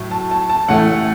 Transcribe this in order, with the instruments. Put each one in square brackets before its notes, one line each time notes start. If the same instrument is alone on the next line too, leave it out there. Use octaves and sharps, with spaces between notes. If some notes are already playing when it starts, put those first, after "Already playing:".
Already playing: [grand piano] A2 F#3
A5
A5
A5
A1 A2 A3 F#5